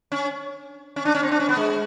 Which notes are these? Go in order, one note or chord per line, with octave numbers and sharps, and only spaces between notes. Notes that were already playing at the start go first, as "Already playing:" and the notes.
C#4
C#4
D4
C#4
C4
D4
C#4
B3
G#3